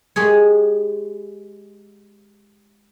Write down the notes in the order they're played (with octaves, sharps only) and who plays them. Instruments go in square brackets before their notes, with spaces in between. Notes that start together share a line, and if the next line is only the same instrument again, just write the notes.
[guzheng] G#3 G4 G#4 C#5